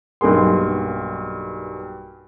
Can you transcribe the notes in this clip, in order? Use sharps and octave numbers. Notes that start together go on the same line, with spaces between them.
B1 G2 A#3 G#4 C6